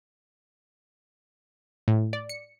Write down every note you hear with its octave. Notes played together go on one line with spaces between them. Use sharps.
A2
D5
C#7